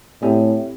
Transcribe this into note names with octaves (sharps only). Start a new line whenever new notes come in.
A2 C4 G4 D5